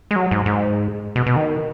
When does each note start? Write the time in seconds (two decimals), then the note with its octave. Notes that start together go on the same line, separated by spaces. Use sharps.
0.11 G#3
0.16 F#3
0.31 G#2
0.46 G#2
1.16 B2
1.26 B2
1.36 D#3